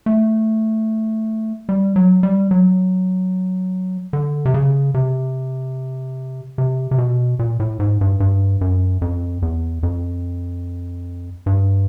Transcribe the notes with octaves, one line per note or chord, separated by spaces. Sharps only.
A3
G3
F#3
G3
F#3
D3
C3
C#3
C3
C3
C3
B2
A#2
A2
G#2
G2
G2
F#2
F2
E2
F2
G2